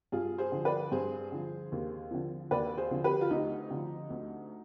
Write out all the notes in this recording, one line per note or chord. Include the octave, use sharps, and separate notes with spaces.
G2 F4 G#4
G#4 C5
D3 F3
B4 D5
G2 G#4 C5
D3 F3
D#2
D3 F3
D#2 B4 D5
G#4 C5
D3 F3
G4 B4
F4
D2 D#4 G4
D3 F3
D2